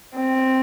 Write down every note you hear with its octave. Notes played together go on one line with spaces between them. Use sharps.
C4